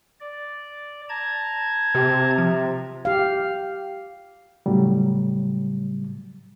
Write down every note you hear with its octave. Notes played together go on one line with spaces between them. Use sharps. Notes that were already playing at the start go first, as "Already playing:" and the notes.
D5
A5 A#5 G#6
C3
F3
G4 F5
A2 C#3 F#3 G3